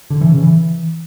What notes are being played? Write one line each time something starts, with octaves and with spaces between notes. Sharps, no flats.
D3
E3
C#3
E3